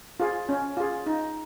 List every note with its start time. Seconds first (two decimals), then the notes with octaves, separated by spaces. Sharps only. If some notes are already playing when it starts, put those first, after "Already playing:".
0.20 F4 G#4
0.49 C#4
0.77 F4 G#4
1.06 D#4